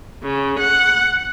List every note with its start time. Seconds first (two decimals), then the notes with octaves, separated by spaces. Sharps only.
0.22 C#3
0.58 F#5